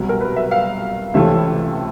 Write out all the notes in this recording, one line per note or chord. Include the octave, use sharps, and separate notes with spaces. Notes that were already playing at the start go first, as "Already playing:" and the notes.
Already playing: C2 B2 F#3
A#4
B4
E5
F5
C#2 C3 E3 A3 C#4 E5